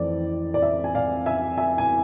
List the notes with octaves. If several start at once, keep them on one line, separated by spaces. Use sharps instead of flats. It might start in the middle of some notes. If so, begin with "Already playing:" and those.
Already playing: F2 E3 A3 C4 D5
D5
E5
G#5
D5 F5
E5 G#5
E5 G#5
G#5